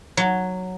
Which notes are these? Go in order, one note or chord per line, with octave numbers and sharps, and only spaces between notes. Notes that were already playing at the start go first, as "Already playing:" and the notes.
F#3